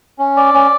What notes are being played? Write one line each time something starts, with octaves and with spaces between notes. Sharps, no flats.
C#4
D5
C#4